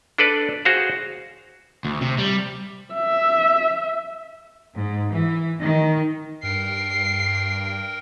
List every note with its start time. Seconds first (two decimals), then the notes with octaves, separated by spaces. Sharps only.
0.18 D4 A4 B4 D5
0.65 F#4 G#4 C5 F5
1.85 D2
2.01 C3
2.18 G3
2.94 E5
4.77 G#2
5.11 E3
5.62 D#3
6.43 G2 A#4 G5 C7